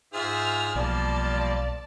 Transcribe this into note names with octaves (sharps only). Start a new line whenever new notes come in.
G#2 F4 G#4 C5 E5 D#6 F6
B1 F3 G3 A#3 F4 D5 A5